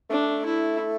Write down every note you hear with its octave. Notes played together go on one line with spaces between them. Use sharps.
A3 D4
E4